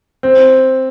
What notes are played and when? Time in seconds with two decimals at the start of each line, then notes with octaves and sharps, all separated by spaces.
0.23 C4